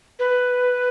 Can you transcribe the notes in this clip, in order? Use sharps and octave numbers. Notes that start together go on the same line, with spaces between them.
B4